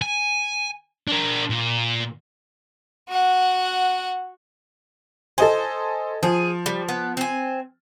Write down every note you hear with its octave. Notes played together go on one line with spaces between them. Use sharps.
G#5
D4 A#4
A#2
F#4 F#5
A4 C5 D#5 G#5
F3 G#4
G3
B3
C4 G#5